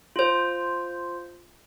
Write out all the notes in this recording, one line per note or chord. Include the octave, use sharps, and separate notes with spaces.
F4 C5